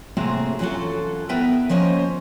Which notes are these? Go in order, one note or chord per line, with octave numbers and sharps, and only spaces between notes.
A2 C3 A#3 C4 F#4 G#4
F#2 E3 F#3 F4 F#4 A4
B3 E4 A#4 B4 E5 G5
F3 A#3 C#4 C5 D#5